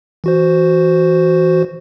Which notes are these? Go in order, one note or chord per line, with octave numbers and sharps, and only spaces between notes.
E3 F#4 C5